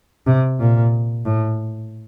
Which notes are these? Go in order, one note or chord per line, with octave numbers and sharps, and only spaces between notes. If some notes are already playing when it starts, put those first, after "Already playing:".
C3
A#2
A2